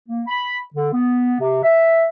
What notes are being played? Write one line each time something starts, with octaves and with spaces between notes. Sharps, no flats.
A#3
B5
D3
B3
C3
E5